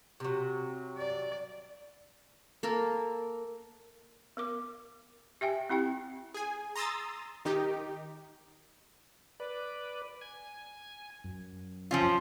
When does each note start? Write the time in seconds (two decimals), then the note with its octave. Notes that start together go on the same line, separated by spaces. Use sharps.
0.20 C3 F#3
0.98 D5
2.63 A#3 A4 A#4
4.37 B3 A#4 D6
5.41 G4 E5 G5 G#5
5.69 C4 E4 G4 G5
6.34 G#4 G#5
6.76 A#5 C6 D#6 E6 A6
7.45 D#3 D#4 G4
9.40 B4 D5
10.21 G#5
11.24 F#2
11.91 F3 C#4 F4